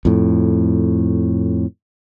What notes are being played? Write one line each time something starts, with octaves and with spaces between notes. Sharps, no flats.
F2 A2